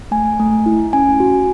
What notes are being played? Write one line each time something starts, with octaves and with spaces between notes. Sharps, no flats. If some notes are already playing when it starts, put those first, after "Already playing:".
A3 G#5
A3
E4
C#4 G#5
F#4